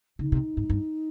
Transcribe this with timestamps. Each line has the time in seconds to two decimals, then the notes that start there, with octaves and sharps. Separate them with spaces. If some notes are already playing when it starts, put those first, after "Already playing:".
0.19 C#3 D#4
0.32 C3
0.57 G#2
0.70 G2